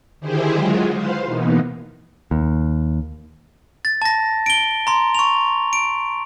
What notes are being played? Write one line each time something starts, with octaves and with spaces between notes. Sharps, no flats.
D3 D#3 E4 G4 G#4 C5
F#3 G#3 F4 F#4
B4 C5 F5 C6
B2 E3 A#3 B3 D#4
D#2
A6
A5 A#6
D7 G7
A#5 C6
C#6 F7
D7